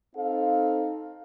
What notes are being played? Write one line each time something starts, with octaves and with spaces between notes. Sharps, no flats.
C4 D#4 A4 F5